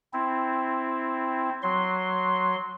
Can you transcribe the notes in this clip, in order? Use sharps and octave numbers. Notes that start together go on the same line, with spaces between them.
C4 E4
F#3 C6